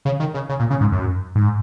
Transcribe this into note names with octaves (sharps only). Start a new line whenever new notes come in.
C#3
D#3
C#3
C#3
A#2
C#3
G#2
F#2
G#2